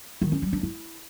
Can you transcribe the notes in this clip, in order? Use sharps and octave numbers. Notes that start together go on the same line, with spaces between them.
D#3
C#4
G3
D4
E4